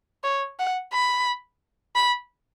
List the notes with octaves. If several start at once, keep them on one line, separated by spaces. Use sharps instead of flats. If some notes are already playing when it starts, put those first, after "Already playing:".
C#5
F#5
B5
B5